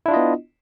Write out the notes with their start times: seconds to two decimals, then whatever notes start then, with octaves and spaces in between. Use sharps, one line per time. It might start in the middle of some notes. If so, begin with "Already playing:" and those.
0.06 E4
0.08 D4
0.11 F4
0.14 D#5
0.16 B3